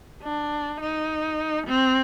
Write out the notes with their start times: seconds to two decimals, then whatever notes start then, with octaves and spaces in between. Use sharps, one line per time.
0.22 D4
0.81 D#4
1.67 C4